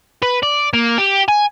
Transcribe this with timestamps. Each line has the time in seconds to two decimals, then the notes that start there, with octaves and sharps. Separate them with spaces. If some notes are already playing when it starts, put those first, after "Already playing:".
0.22 B4
0.43 D5
0.73 A#3
0.98 G4
1.29 G#5